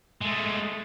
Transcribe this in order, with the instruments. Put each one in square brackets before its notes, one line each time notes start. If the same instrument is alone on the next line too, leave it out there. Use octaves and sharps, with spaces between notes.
[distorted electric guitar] G#3 A3